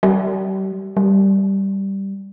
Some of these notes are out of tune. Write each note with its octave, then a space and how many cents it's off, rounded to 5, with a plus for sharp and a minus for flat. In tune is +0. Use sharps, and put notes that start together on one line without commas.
G3 -35
G3 -5